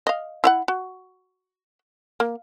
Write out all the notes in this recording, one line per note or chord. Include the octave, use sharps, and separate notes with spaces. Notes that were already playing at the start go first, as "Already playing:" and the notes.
D#5 F5
E4 F5 F#5
F#4
A#3